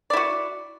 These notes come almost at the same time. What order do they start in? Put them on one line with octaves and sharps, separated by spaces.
D5 E4 F#4